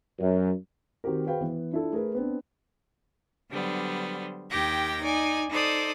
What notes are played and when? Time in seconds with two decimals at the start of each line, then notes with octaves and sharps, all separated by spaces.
0.19 F#2
1.04 D#3 C4 F#4 G4 A#4
1.26 F#4 G#4 B4 C5 F5 G5
1.41 E3 B3
1.72 D4 E4 F4 A4
1.92 A3 G#4 A#4 B4
2.15 B3 C4 D4
3.51 D3 F#3 G3 B3 C5
4.50 D#2 D#3 G4 G5 G#6 A#6
5.01 D#4 D5 G#5
5.50 D#4 A4 C5 D5 D6 D#6